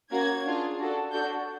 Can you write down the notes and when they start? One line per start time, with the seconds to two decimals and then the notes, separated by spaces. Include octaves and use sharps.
0.12 A#3 C#4 F#4 G#6
0.46 D4 F4 G#4
0.78 D4 F#4 A4
1.12 D4 F#4 A4 G6